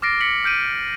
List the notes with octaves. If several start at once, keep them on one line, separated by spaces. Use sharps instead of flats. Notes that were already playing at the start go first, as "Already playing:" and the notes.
D6 F6 A6 A#6 C7 D7
B6 C#7 F#7
F6 G6 D7 D#7